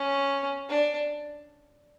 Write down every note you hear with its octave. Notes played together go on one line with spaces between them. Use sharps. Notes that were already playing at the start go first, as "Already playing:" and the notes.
Already playing: C#4
D4